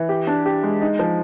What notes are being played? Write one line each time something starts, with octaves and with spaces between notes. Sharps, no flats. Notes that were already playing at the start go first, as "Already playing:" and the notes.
Already playing: E3
G4
D4
G4
G#3
D#4
F3